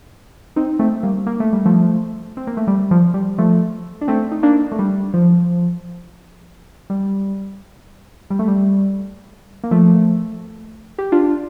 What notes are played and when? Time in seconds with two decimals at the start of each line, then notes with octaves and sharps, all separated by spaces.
0.56 C4 D#4
0.79 A3 C4
1.03 G3 A#3
1.26 A#3
1.40 A3
1.53 G3
1.65 F3 A3
2.37 C4
2.47 A#3
2.57 A3
2.67 G3
2.91 F3
3.14 G3
3.38 F3 A3
4.01 D4
4.08 A3 C4
4.32 D#4
4.43 A#3 D4
4.72 A3
4.79 G3
5.14 F3
6.90 G3
8.30 G3
8.39 A3
8.48 G3
9.64 A#3
9.71 F3 A3
10.99 G4
11.12 D4 F4